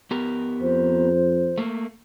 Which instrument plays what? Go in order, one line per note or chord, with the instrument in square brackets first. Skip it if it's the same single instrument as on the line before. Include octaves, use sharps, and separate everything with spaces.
[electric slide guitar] B3 G4 A#4
[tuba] F2 [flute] C5
[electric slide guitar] A3 A#3